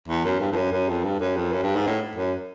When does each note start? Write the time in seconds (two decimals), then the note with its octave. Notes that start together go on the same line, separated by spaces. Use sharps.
0.08 E2
0.25 F#2
0.40 G2
0.52 F2
0.56 F#2
0.72 F#2
0.89 F2
1.04 G2
1.20 F#2
1.36 F2
1.52 F#2
1.63 G2
1.76 G#2
1.87 A2
2.16 F#2